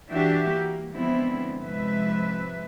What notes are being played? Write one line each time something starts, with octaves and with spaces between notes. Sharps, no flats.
E3 D4 F#4 G4 E5
A#3
D3 F3 G#3 B3 C4 E4
G#2 C3 F3 B4 E5